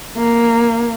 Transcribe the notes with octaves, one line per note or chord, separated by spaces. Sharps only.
A#3